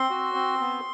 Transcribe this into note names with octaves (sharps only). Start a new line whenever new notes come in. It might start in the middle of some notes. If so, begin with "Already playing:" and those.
Already playing: C4 C6
F#4
C4
B3